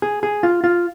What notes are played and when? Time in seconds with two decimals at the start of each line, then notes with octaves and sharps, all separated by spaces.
0.02 G#4
0.23 G#4
0.43 F4
0.64 F4